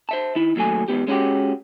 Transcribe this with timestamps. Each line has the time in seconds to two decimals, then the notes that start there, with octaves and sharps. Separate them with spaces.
0.09 C5 E5 A5
0.35 D#3 E4
0.56 D#2 F#3 A3 G#5
0.88 E2 G#2 C#3 B3 G4
1.07 G#3 C#4 D#4 F#4 G4